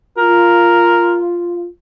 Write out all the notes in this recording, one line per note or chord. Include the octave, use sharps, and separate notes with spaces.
F4 A#4